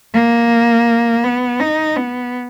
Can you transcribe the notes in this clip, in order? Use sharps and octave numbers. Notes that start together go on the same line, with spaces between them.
A#3
B3
D#4
B3